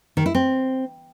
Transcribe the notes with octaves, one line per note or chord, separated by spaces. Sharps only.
D#3
E4
C4